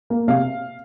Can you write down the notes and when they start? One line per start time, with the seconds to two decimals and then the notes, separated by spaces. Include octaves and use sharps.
0.10 A#3
0.28 C3 F5